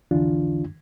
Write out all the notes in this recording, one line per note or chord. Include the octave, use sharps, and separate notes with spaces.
C2 F2 D3 E3 D4 F4